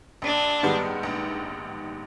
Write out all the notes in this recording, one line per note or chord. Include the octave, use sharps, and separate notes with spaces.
A#1 D4
G#2 D#3 G3 B3
A#1